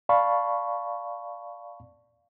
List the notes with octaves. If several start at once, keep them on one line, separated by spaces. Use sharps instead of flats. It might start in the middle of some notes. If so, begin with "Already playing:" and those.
D5 F5 A5 B5 C#6